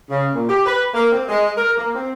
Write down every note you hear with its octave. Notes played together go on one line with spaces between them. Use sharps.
C#3
A#2
G4
B4
A#3
C4
G#3
A#4
A#3
C4